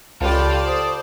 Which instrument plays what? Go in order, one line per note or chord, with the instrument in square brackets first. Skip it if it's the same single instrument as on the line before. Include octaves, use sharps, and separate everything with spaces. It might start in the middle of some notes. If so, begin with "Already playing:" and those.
[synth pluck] C#2 [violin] F4 G4 [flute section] A4 B5 [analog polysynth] D5 A5
[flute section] A4 D#6 [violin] C5